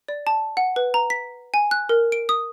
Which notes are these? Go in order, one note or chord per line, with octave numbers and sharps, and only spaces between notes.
D5
A5
F#5
B4
A#5
B6
G#5
F#6
A#4
D7
D#6